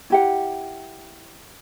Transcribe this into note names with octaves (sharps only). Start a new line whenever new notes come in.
E4 G4 F#5